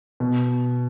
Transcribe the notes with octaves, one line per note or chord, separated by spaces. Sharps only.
B2